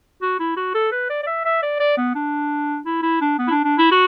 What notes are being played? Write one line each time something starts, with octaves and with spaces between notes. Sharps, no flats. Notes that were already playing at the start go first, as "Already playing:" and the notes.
F#4
E4
F#4
A4
B4
D5
D5
E5
E5
D5
D5
B3
D4
E4
E4
D4
B3
E4
D4
D4
E4
F#4